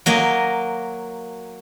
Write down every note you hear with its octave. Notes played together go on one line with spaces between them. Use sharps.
F#3 A#3 D#5 G#5